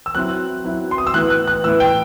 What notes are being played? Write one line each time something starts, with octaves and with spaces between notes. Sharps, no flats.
E6
F#3 C4 E4 F#6
F#3 C4 E4
C6
D#6
E6
A2 E3 B3 E4 F#6
F#6
F#6
A2 E3 B3 E4 E6
G5